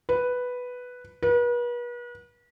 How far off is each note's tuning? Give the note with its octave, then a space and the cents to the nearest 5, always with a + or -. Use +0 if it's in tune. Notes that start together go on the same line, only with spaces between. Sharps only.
B4 +0
B4 -40